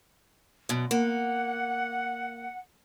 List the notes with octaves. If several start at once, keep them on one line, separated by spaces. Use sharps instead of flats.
F#2 B2
A#3 F#5